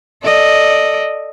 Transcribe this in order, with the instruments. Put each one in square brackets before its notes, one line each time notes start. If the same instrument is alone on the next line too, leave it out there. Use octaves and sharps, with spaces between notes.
[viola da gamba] A4 D5 D#5